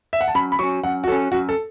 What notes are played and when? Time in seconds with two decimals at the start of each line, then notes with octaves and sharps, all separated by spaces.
0.13 E5
0.21 F#5
0.28 A5
0.35 F#2 B5
0.52 B5
0.59 F#3 C#4 C#6
0.83 F#2 F#5
1.04 F#4
1.08 F#3 C#4 A4
1.32 F#2 F#4
1.49 A4